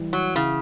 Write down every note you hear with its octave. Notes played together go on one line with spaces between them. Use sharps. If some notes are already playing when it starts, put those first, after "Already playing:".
Already playing: E3 G3
F#3
C#3 E4